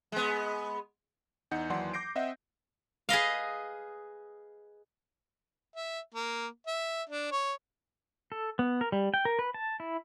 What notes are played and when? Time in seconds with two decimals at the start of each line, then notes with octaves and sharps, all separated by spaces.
0.12 G#3 B3
1.51 E2 D#4 F#5 G6 C#7
1.70 D#2 E3 F#3 D5 F#5 C6
1.93 D6 G6 A#6 C7 D7
2.15 C4 D#5 E5 F#5
3.09 G#4 B4 D#5 F5
5.75 E5
6.15 A#3
6.67 E5
7.10 D4
7.31 C#5
8.32 A4
8.59 B3
8.81 A#4
8.92 G3
9.14 G5
9.25 A#4
9.39 B4
9.54 A5
9.80 E4